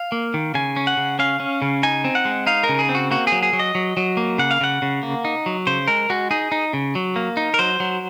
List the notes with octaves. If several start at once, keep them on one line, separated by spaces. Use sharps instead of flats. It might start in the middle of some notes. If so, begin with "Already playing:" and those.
Already playing: F5
A#3
D#3
C#3 G#5
C#4
F#5
C#3
C#4 F5
C#4
C#3
D#4 G#5
C4
F#5
G#3
D#4 F5
A#4
C#3
G#4
C4
F#4
A#3 F#4
F#3 G#4
G#4
F#3
D#5
F#3
F#3
A#3
C#3 F#5
F5
C#3 F#5
C#3
A#3
D#4
F#3
C#3 C5
G#3 A#4
G#3 F#4
D#4 G#4
D#4
C#3
F#3
A#3
D#4
A#4
F#3 C5
F#3